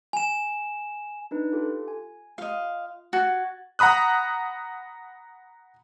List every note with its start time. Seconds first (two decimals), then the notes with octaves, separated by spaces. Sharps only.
0.13 G#5 E7
1.31 D4 D#4 B4
1.53 F4 G4 A4
1.88 G#5
2.38 F4 D#5 F5
3.13 F#4 G#6 A6
3.79 F#5 A#5 B5 D#6 F#6